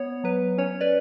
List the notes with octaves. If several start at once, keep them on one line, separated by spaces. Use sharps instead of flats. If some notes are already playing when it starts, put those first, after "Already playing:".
Already playing: B3 C#5
F#3 B4
C#4 C#5
B4 D5